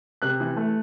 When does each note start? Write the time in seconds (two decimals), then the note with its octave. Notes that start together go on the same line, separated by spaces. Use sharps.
0.22 C3 F#6
0.40 E3
0.56 A3